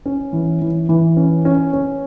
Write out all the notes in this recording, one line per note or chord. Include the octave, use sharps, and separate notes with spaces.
C#4
E3
E3
E3
C#4
C#4
C#4